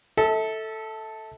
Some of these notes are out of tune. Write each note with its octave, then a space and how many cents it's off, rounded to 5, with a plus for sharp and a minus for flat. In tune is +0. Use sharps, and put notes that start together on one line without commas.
A4 +0 E5 -35